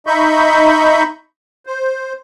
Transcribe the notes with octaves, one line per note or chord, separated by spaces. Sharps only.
D#4 D#5 E5 B5 C#6 G6
C5